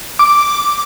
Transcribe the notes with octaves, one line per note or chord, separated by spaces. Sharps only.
D6